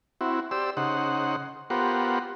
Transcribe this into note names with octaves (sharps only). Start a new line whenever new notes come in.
C4 E4 F#4
G4 C5 D5 E6
C#3 D#4 C5 F#5
B3 F4 G4 A#4 C5 F#5